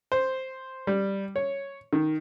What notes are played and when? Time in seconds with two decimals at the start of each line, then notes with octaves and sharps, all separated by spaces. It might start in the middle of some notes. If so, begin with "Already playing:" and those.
0.12 C5
0.87 G3
1.36 C#5
1.93 D#3